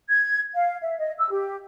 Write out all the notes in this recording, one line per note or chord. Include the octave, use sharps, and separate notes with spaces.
G#6
F5
E5
D#5
E6
G4